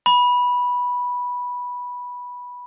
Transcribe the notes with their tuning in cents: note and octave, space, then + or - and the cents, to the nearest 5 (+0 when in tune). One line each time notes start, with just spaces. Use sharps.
B5 -10